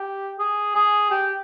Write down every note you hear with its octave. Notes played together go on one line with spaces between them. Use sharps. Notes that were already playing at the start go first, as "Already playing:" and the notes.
Already playing: G4
G#4
G#4
G4